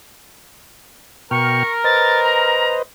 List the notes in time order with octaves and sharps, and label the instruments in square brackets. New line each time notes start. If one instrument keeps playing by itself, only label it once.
[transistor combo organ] B2 G5 F6 [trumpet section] A#4 [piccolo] C#6
[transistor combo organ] B4 C5 D#5 [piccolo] A6
[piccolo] A#5